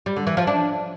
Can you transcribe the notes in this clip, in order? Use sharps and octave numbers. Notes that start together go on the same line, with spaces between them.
G3
D3
E3
F3
D4